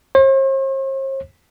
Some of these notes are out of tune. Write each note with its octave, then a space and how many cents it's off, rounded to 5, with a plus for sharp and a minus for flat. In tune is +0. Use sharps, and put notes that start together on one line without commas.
C5 +45